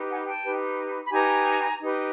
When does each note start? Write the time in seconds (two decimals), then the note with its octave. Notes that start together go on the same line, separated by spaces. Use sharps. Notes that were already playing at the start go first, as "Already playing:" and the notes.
Already playing: D#4 G4 B4
0.09 F#5 G#5
0.26 G5 A5
0.44 D#4 G4 B4
1.04 B5
1.11 D#4 G4 B4 G#5 A#5
1.79 D#4 G4 B4